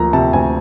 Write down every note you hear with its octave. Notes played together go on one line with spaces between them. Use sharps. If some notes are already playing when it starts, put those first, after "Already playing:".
Already playing: D2 F3 A#3 A#5
C3 A5
D2 G#5